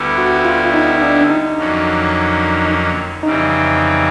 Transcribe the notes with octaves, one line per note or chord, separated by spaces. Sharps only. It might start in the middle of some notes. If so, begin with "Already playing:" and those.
Already playing: D2 D3 G3 B3 E4
F#4
F4
D#4
D4
D#4
F2 D3 F#3 A#3 C#4
F2 C#3 E3 G3 C4 D#4